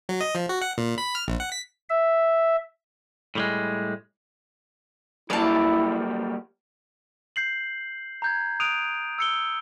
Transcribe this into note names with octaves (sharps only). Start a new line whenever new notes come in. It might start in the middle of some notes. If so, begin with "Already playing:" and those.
F#3
D#5
F3
F#4
F#5
A#2
B5
F6
A#1
F#5
B6
E5
A2 G3 G#3
F#3 G3 A#3 E4 D5 A5
G6 C7 F#7
A#5 G6 G#6
D#6 F#6 D7 D#7 F7
E6 C#7 G7